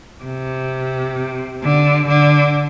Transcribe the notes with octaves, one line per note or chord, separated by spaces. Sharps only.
C3
D3
D3